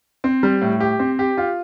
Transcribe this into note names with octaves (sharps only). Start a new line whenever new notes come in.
C4
G3
A2
G4
C4
G4
F4